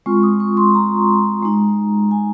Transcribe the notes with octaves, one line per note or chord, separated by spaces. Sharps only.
G#3 C4 F4 C#6
D#6
C#6
C6
A#5
G#3 D#4
G#5